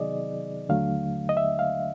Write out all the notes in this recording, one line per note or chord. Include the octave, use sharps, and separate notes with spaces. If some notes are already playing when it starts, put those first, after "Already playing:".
Already playing: C3 D#3 F#3 B3 D#4 G#4 D5 D#5
D#2 D3 F#3 A3 D4 F5
D#5
E5
F5